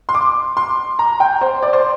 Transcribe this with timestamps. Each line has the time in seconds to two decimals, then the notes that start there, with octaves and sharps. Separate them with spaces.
0.09 C6
0.14 D6
0.57 C6
0.99 A#5
1.20 G5
1.41 C5
1.62 D5
1.73 C5